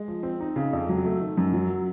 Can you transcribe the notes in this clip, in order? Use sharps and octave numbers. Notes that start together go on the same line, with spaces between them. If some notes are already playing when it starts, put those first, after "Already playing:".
Already playing: G#3
F3
C4
D#4
C#3
F2
F#3
A3
D#3
F#2
F#3